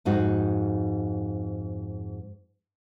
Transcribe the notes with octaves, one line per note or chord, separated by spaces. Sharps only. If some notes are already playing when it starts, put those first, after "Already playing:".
F2 G#2 D#4 F#4